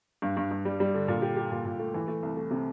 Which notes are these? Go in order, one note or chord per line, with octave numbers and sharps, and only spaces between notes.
G2
G2
G2
G3
G3
D3
A#2
G4
G4
A#2
A#2
A3
E3
A3
C2
A3
C3